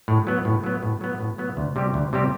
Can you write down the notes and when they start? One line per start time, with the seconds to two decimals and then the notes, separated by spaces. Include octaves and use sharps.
0.08 A2
0.27 F#3 B3
0.45 A2
0.64 F#3 B3
0.83 A2
1.01 F#3 B3
1.20 A2
1.38 F#3 B3
1.57 D2
1.76 C3 G3 C4 G4
1.94 D2
2.13 C3 G3 C4 G4